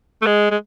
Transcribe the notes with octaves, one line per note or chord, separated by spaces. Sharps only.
A3
G#3
G#3